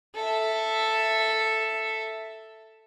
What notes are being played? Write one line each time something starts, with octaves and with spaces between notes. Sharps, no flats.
A4 E5